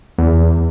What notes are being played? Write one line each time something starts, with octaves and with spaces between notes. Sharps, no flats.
E2